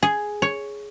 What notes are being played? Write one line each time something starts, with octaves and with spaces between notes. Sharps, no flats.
G#4
C#5